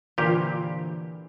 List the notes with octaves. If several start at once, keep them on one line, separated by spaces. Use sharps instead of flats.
A#2 D3 E3 F4 G4 C5 D5